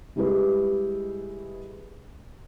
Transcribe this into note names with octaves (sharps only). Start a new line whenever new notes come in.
G3 G#3 E4 G4 G#4 B4